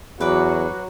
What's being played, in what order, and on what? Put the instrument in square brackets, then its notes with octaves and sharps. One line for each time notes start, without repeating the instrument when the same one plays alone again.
[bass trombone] E2 [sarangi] F#3 [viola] F#4 [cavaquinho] B4 D6